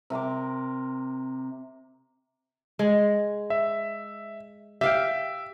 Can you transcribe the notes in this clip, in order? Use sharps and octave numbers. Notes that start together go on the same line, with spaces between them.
C3 A#4 C5 D6
G#3
E5
G4 E5 F5 G5